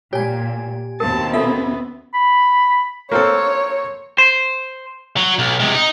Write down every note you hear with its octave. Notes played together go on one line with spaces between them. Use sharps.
A#2 G4 C#5 G#5
D#2 B2 C4 A#4 A5
B3 C#4 F4 A4 E5
B5
A#3 C4 A4 C#5
C5
F#3 F#4
B1
C3 G#3
D#4